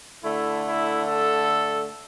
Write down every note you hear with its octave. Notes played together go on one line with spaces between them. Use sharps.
D3 A3 E4
E4
A4